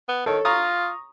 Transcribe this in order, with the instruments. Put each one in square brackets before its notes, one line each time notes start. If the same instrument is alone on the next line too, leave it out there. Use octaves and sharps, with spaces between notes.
[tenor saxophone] B3
[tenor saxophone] D#3 [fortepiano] A4 C#5
[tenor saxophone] F4 [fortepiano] A#5 C#6 D#6